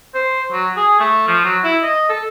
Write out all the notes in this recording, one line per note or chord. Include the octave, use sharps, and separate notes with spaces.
C5
F#3
G#4
A3
F3
F#3
E4
D#5
A4